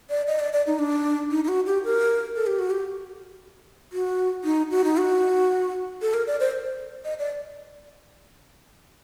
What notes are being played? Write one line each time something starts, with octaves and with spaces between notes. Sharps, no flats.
D5
D#5
D5
D5
D#4
D4
D#4
D#4
F#4
G4
A#4
A4
G4
F#4
G4
F#4
D#4
F#4
D#4
F#4
A4
A#4
D5
C5
D#5
D5